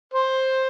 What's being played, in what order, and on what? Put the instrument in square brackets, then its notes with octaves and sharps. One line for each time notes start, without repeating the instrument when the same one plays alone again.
[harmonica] C5